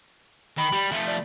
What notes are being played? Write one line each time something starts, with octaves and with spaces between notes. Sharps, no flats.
D#3 B5
G3
F3 A3
D5